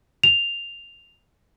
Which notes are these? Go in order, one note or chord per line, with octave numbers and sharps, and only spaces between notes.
F7